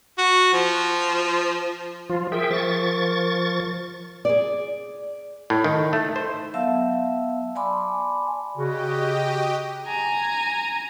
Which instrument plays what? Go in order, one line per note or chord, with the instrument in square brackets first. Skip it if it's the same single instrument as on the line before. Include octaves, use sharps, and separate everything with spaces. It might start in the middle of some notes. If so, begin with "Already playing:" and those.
[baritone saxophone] F#4
F3
[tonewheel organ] F3 F4
[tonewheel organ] G#4 E5 G5 [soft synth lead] A#4
[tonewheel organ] F3 C#6 A6
[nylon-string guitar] G#4 D5
[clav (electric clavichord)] A2
D#3
A3
C5
[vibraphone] F#3 B3 E5 F5 A5 E6
D5 G#5 A5 B5 C6 D6
[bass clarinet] C#3 [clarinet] F#4 [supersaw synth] G4 D#5 G5
[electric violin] G#5 A#5